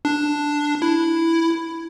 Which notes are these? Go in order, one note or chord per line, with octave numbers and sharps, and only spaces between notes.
D4
E4